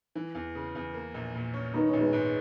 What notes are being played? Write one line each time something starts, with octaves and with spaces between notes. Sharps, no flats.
E3
E2
C#3
E2
A#3
A#1
A#2
C#4
D#3 B3 D#4
A#1 C#4
G#3 B3
G#2